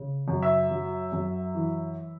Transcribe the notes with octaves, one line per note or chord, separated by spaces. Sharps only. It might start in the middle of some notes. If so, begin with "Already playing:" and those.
Already playing: C#3
F#2
E5
F#3
F#2
E3